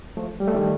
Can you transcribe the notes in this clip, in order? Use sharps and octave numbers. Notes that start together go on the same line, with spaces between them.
F3 A3
G3
A3
D#3 G3